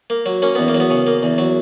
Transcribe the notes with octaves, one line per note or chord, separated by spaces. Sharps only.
A#3
F#3
A#3 C#4
E2 B3
A#3
F#3
B3
C#3
A#3
E2
F#3